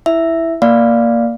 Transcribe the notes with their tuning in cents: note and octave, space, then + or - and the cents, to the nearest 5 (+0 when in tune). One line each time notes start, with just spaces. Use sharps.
E4 +0 E5 +0
A#3 +0 D5 +0 F5 +0